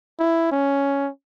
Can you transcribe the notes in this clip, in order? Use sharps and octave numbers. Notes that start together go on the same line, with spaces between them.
E4
C#4